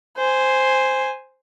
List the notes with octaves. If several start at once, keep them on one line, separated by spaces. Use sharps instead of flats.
C5 G#5